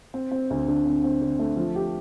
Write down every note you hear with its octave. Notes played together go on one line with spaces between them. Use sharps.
C4
C4
D2
D3
C4
C4
D3
A3
F3
G4